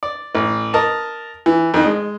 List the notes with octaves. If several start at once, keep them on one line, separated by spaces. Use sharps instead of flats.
D5
A1
A#4 D#5 A5
E3
F2 D#3
G#3